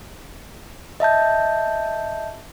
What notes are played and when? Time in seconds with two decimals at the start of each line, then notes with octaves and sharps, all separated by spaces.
1.00 D#5 E5 A5 G6